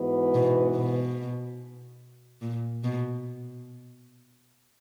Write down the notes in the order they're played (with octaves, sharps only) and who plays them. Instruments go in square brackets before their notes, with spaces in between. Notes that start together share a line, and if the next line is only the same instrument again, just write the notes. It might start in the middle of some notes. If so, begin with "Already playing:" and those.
Already playing: [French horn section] G#2 E3 B3 F#4 B4
[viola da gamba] B2
B2
A#2
B2